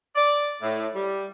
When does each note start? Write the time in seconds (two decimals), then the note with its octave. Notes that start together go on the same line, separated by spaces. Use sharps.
0.15 D5
0.61 A2
0.96 G3